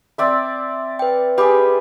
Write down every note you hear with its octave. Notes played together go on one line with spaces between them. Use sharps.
C4 D5 E5
B4 G5
G4 G#4 B4 B5 D6